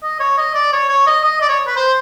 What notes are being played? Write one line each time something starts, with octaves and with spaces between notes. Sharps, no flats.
D#5
C#5
D#5
D5
C#5
C#5
D#5
D#5
D5
C#5
B4
C5